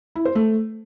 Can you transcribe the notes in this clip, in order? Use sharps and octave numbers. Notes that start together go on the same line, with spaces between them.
E4
C5
A3